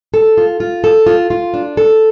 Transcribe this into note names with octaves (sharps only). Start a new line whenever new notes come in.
A4
F4
F4
A4
F4
F4
D4
A4